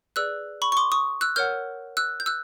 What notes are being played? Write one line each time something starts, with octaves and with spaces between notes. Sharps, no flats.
G#4 B4 D5 E6 F#6
B5 C#6
C#6
C6 D6
C#6 D#6
E6 F#6
A#4 C#5 F#5 F6 G6
E6 F#6
G6
E6 F#6